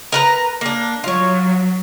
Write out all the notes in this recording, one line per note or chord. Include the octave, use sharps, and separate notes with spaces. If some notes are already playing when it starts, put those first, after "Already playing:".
A#4 B4 A#5
A#3 D4
F#3 F4 C#5